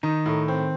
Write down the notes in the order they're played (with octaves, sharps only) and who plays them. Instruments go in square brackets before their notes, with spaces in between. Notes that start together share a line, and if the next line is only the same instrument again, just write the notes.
[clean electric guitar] D#3 [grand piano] D#4
[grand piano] A2
C4